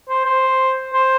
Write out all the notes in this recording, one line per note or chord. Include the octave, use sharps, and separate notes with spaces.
C5
C5
C5